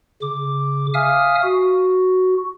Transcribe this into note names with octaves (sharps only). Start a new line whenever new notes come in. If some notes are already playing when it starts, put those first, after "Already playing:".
C#3 D6
E5 F5 G#5 D#6 F6
F#4